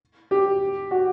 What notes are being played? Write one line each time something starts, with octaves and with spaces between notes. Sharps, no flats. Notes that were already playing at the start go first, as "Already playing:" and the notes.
G4
F#4